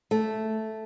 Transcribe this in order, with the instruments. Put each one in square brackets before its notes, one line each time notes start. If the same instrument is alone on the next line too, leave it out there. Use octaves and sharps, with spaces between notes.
[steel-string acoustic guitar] A3